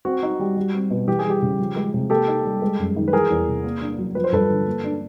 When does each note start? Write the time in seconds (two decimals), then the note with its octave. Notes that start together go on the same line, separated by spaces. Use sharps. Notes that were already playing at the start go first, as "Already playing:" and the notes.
0.05 C4 F#4
0.23 D#4
0.40 G3
0.57 G3
0.74 C4
0.90 B2
1.08 E3 G4
1.19 G#4
1.25 G3 G4
1.42 C#3
1.60 F3
1.76 G#3
1.94 C3
2.10 A#3 G4 A4
2.28 D#4
2.44 G3
2.62 G#3
2.79 F#2
2.96 D#3
3.08 B4
3.13 E3 G#4 A#4
3.30 E2
3.48 C3
3.64 A#3
3.81 D4
3.98 F#3
4.15 F3 B4
4.24 C5
4.32 G2 A4 B4
4.50 D3
4.66 A#3
4.84 D4